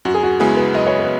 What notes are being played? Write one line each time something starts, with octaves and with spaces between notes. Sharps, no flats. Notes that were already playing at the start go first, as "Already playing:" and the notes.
F#2 F#4
G#4
F#4
C#3 G#3 B3 E4 G#4
B4
F#2 D#5
C#5
B4